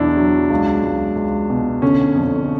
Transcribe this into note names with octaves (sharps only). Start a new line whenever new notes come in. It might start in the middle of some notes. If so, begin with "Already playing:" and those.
Already playing: E2 B2 F#3 D4 E4
F#3
C#2
C#2
C#2
B2
D3 C#4
F2